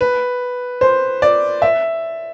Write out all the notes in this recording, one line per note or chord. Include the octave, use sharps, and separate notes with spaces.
B4
C5
D5
E5